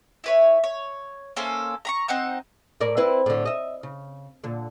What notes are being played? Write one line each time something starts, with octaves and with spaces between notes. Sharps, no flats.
E4 B4 C#5
C#5
A#3 C#4 A4 C5
A#5 B5 C#6
C4 D#4 F#5 G6
A2 A#4 D5
C4 E4 B4
A2 D3
D#5 E5
C#3
A#2 D3